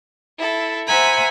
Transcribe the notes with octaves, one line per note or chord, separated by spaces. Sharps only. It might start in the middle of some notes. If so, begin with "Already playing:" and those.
E4 A4
C5 E5 F#5 G#5 A#5 B5